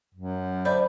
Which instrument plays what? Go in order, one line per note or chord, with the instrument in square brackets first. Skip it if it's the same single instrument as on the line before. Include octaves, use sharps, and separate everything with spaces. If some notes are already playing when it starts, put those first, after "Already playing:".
[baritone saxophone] F#2
[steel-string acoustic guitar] D3 D5 E5 [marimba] C5 B5 G6